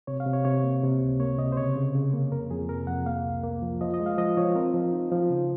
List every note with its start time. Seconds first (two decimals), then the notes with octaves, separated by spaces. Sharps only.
0.07 C3 C#5
0.20 F5
0.26 C3
0.33 C#5
0.45 C3 C#5
0.64 A#3
0.83 C3
1.01 C#2
1.20 A#3 C#5
1.38 C3 D#5
1.52 C5
1.57 C#3 C#5
1.76 C#3
1.95 C#3
2.13 A#3
2.31 F2 A#4
2.50 F2 G#4
2.69 C3 A#4
2.87 F2 F#5
3.06 A#3 F5
3.25 C2
3.43 A#3
3.62 F3
3.81 F3 D#5
3.94 D#5
4.00 G#3
4.06 F5
4.18 F3 D#5
4.37 F3 C#5
4.55 C4 A#4
4.74 F3
4.92 D#4
5.12 F3
5.30 C#3